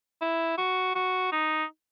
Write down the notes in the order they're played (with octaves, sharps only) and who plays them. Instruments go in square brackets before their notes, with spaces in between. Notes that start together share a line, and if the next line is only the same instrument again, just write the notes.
[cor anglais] E4
F#4
F#4
D#4